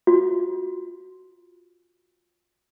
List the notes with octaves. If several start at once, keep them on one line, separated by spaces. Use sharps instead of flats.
F4 F#4